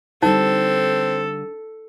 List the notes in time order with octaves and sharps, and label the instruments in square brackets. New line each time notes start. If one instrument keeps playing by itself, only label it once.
[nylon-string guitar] D3 G3 [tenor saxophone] C4 [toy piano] D#4 [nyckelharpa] A4